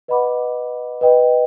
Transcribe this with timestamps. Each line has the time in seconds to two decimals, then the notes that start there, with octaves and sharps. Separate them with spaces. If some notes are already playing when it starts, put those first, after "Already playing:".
0.08 B4 D#5 F#5 B5 D6
1.01 B4 D#5 G5